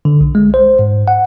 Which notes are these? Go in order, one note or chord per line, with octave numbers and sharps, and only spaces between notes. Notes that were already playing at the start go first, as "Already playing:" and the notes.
D3
B1
G#3
C5
G#2
F#5